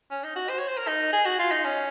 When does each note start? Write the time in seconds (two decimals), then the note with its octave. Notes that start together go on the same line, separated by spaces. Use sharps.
0.11 C#4
0.23 D#4
0.36 F#4
0.49 C5
0.59 C#5
0.68 C5
0.77 A#4
0.87 D#4
1.12 G#4
1.25 F#4
1.39 F4
1.51 D#4
1.64 C#4